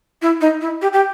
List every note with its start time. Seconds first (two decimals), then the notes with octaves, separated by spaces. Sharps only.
0.22 E4
0.41 D#4
0.61 E4
0.82 G4
0.93 G4